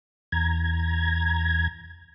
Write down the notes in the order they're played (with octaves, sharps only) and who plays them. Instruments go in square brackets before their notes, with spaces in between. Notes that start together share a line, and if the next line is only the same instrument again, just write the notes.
[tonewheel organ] E2 A#5 G#6